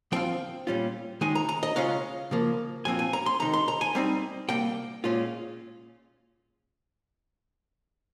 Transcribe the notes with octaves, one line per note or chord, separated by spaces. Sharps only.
F3 C4 F4 G5
A#2 G3 C#4 F4
D#3 G#3 D#4 G#5
A#5
A#5
D#5
C#3 G#3 C#4 F4 F5
C#3 F3 A#3
A#2 F3 C4 F4 G#5
G#5
A#5
C6
C3 D#3 G#3 D#4 A#5
C6
A#5
G#5
G3 C4 D#4
C3 G3 A#3 G5
A#2 G#3 C#4 F4